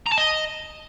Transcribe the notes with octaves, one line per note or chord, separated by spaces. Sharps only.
A#5
A5
D#5